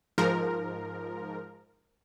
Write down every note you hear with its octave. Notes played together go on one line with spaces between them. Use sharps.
G#2 F3 A#4